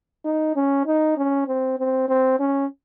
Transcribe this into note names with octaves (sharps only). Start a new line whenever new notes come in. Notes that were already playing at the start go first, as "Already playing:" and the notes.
D#4
C#4
D#4
C#4
C4
C4
C4
C#4